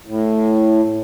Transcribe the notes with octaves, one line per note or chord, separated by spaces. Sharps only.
A2